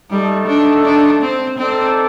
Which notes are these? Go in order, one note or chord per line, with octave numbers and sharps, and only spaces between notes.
G3 A3 D#4 A4
D4
D4
C4
C4 D#4 A4 D5 G5